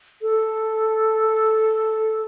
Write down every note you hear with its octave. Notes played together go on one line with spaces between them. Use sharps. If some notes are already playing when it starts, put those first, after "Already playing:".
A4